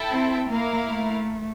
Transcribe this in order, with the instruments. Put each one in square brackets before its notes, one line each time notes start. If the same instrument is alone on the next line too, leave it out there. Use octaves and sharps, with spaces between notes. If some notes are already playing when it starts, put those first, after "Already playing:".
Already playing: [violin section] E4 A4 E5 G5
[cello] C4
[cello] A#3 [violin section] E4 A#4 F5
[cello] A3